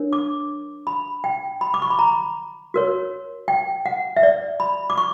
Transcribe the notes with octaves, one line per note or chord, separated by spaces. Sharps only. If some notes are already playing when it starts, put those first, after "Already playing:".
Already playing: D4 A#4 C#5
D6
B5
G5
B5
D6
C#6
B5
A#5
F#4 A#4 C#5
G5
F#5
E5
D5
B5
D6
C#6